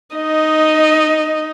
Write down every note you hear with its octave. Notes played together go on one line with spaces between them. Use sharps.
D#4 D#5